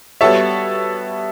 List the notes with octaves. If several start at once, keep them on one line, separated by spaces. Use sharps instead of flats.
G3 B3 F#4 A4 C#5 E5